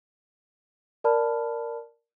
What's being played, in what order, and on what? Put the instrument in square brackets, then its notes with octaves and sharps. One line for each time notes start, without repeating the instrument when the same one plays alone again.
[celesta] A#4 D5 A5 B5 F6